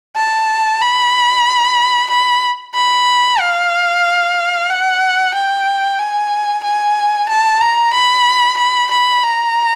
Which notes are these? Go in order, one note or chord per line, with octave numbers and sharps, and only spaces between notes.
A5
B5
B5
B5
F5
F#5
G5
G#5
G#5
A5
A#5
B5
B5
B5
A#5